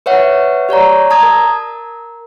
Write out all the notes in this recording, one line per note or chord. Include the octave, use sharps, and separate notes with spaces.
B4 C#5 E5 F#5
G4 C#5 D5 A#5
A5 A#5 D#6 G#6
A#4